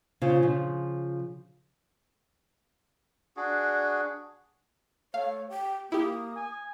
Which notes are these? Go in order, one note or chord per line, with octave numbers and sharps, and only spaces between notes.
C#3 C#4 F4 C5
C#3 F3
D4 F#4 G#4
A3 C#5 F5
G4 G5
A#3 E4 G4 D#6
G#5